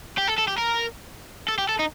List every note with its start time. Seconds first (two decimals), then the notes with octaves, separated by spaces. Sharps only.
0.18 G4
0.28 A4
0.39 A4
0.48 G4
0.58 A#4
1.48 A4
1.58 G4
1.69 A4
1.79 D#4